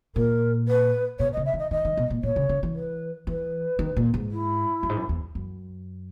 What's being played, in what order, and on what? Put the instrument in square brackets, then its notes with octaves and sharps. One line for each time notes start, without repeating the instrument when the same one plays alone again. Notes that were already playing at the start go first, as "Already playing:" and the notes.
[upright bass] A#2 [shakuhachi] A#4
[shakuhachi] B4
[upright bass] B2 [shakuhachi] C#5
[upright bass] C#3 [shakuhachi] D#5
[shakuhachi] E5
[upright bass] D#3
[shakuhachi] D#5
[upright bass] D#3 [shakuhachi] D#5
[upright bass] D#3
B2
A#2
[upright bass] A#2 [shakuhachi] C#5
[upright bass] C#3
C#3
E3
[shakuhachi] B4
[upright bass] E3 [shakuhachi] B4
[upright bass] D#3
A#2
G#2
[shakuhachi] E4
[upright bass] F#2
G#2
F#2
E2
F#2